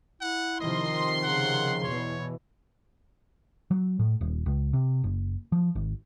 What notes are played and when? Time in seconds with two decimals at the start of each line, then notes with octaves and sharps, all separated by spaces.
0.21 E4 F#5
0.61 C3 D#3 F3 D#5 C6
1.23 C#3 F#5
1.84 E2 B2 E3 C#5
3.71 F#3
3.99 A2
4.21 D#1
4.46 C#2
4.73 C3
5.04 F#1
5.52 F3
5.75 G#1